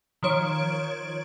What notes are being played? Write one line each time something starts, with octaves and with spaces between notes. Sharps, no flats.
D#3 F3 C#5 D7